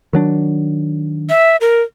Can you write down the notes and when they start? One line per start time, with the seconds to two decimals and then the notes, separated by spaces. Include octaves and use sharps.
0.13 D#3 F#3 D4
1.29 E5
1.61 A#4